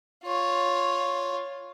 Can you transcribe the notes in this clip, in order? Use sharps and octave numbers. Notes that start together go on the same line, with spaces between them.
F4 C#5